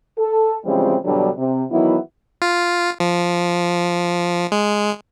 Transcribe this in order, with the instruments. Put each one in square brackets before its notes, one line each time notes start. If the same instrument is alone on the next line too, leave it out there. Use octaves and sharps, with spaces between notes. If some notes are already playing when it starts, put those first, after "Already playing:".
[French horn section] A4
C#3 E3 F3 G3 G#3 C4
E2 G2 B2 D3 F#3 G3
C3
D#3 E3 F#3 B3 E4
[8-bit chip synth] F4
F3
G#3